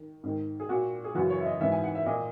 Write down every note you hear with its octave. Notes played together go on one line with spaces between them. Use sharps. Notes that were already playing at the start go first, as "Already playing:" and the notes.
Already playing: D#3
G#2 D#3
G#4
A#2 F#4
G#4
F#2 C#3 E3 F#4
C#5
E5
D#5
G#2 E3 E5
G#5
F#5
E5
A#2 D#5